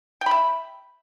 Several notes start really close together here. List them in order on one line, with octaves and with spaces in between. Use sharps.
G5 B5 E5